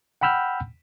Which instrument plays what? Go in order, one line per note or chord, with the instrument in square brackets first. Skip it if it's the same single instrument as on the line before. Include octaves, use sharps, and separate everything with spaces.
[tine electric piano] F#5 G5 B5 E6 F6 G6